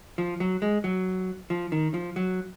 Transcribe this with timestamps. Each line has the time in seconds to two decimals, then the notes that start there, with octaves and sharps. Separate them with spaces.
0.18 F3
0.40 F#3
0.62 G#3
0.84 F#3
1.50 F3
1.72 D#3
1.94 F3
2.16 F#3